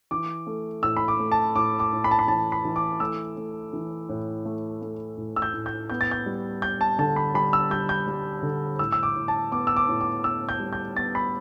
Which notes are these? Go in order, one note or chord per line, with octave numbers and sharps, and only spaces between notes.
E3 D6
A3
A2 E6
B5
D6
A3
A5
A2 D6
D6
A2
B5
A5
B5
E3 A5
B5
E3
D6
A3 E6
A3
E3
A2
A3
A3
A2
E6
G6
A2
G6
B3 G6
A6
G6
G3
B3 G6
A5
D3 A5
B5
G3 B5
E6
G3 G6
G6
G3
D3
A2 E6
E6
D6
A2
A5
B3 D6
E6
D6
A2
D6
B3 E6
G6
G3
G6
B3 A6
B5